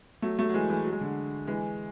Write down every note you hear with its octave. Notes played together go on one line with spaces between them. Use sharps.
F#3 A3
F#3 A3
F#3
E3 G#3
E3 G#3
F#3
G#3
D3 F#3
E3 G#3